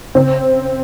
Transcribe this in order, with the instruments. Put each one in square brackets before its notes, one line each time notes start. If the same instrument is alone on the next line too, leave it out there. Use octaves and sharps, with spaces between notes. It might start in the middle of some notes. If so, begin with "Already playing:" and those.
[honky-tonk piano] C#3 C4